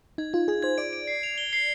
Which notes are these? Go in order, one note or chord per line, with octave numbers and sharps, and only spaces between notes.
D#4 G#6
F4 G#6
G#4 G#6
C5 G#6
D5 D7
D7
C7
F7
G7
C7